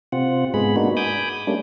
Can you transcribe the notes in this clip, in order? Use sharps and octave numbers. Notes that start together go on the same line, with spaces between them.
C3 C4 F4 F#5
G#2 G#3 B3 G#4 B5
G#3 A#3 B3 D4 D#4 F#4
G#5 B5 D6 D#6 G6
G3 A3 A#3 C#4 D4